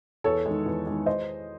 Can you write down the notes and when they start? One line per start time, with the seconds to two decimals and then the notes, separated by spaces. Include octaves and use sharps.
0.24 E2 A4 C#5
0.46 D#3 G#3
0.66 E2
0.87 D#3 G#3
1.06 C5 D#5